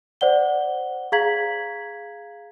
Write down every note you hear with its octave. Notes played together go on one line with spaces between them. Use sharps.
C5 D5 F#5 G7
G#4 F5 A#5 G#6 B6 F#7